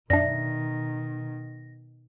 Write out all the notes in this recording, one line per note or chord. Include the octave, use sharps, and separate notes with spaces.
F#2 B2 D#3 D4 D5 E5 A#6